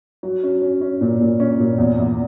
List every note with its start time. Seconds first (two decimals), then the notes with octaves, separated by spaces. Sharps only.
0.23 F#3
0.43 C#4
0.62 C#4
0.81 C#4
1.01 A#2
1.20 A#2
1.40 C#4
1.59 A#2
1.78 E2
1.98 E2